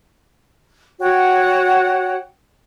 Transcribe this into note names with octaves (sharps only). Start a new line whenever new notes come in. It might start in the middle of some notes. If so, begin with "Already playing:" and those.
F#4 C#5 F#5 G5